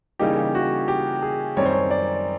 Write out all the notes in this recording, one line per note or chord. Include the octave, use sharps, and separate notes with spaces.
C#3 E3 G3 A#3 D#4 G4
F#4
G4
G#4
F#2 D#3 G3 C4 D#4 C#5
C5
C#5
D5